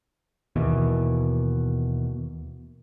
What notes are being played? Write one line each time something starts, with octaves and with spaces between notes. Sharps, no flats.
D#2 B2 E3